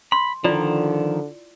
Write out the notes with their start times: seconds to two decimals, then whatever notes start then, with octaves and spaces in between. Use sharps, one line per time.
0.12 B5 C6
0.44 D3 D#3 F3 E4 F4 D5